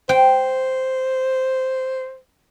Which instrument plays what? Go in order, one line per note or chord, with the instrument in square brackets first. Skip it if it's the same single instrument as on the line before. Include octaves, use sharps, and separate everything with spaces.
[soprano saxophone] C5 [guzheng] G5